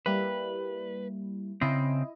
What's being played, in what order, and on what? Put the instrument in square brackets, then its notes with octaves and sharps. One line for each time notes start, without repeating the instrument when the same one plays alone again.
[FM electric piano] G3 A#3 E4 [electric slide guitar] B4
[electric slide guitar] C#3 C4 [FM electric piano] E4 D#5